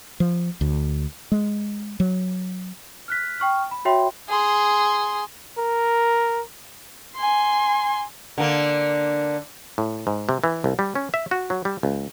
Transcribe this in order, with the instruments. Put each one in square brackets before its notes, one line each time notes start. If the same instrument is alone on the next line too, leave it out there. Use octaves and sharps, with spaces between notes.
[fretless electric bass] F3
D2
G#3
F#3
[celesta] F6 F#6 B6
G5 C#6 F6
B5
F#4 C#5 E5 G5 B5 C6
[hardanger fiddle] G#4 C6
[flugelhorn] A#4
[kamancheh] G#5 C6
[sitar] D3 A#3
[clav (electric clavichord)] A2
G#2
C3
E3
C2
G3
C#4
E5
F#4
F#3
G3
C#2